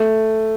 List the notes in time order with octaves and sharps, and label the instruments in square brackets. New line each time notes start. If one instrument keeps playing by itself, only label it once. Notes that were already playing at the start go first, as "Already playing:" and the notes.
Already playing: [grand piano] A3 [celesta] A4